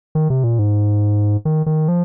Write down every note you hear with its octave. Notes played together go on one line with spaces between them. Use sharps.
D#3
C3
A#2
G#2
D#3
D#3
F3